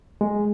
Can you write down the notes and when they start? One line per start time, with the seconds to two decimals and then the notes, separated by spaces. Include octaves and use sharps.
0.21 G#3